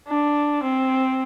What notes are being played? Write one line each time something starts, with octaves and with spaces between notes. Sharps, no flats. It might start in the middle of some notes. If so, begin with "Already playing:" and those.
D4
C4